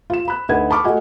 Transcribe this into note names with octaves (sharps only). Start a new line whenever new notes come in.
F4 E7
B5 F#6
D2 D#4 B4 F#5 G#6
A5 B5 C#6 D6 F6
A3 F#4 D#5 F#5 G#5